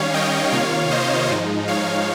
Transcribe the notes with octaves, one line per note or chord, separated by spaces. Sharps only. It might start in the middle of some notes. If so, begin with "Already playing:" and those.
Already playing: D#3 G3 C#4 C#5 F5
D#5 G5
C3 D#3 A#3 F4 C#5 F5
C5 D#5
G#2 F3 G#3 D#4
C#5 F5